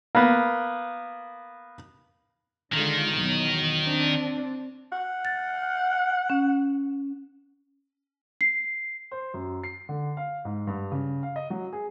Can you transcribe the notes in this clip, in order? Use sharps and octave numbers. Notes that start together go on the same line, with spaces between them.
A#3 B3
D3 D#3 G#3 F4
E2 B2 F#3
C4 D4
F#5
A6
C#4
C7
C5
F#2
C7
D3
F5
G#2
G2
C#3
F5
D#5
F#3
G#4